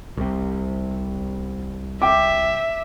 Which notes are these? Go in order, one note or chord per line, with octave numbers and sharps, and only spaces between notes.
C2 C3
E5 G5 D6